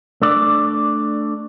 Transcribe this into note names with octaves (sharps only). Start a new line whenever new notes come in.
A3 D4 D5